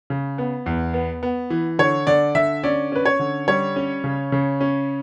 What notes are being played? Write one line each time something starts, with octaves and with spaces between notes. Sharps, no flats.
C#3
B3
E2
B3
B3
E3
D3 C#5
D3 D5
D3 E5
C#4 D5
C#4 B4
C#5
D3
G3 C#5
C#4
C#3
C#3
C#4